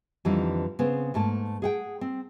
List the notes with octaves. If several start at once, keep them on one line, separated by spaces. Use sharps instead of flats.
F2 D3 E3 G3 D4 D#4
C#3 B3 C4 C5
G#2 A3 A#3 A5
G#4 F#5 G5
C4